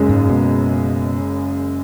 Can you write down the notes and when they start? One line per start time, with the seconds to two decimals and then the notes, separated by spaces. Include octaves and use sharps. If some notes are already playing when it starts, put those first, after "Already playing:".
Already playing: F#1 F#2 C#3 G#3
0.09 G#2
0.29 B2